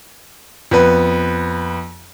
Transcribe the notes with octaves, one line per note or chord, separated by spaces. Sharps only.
F2 B3 B4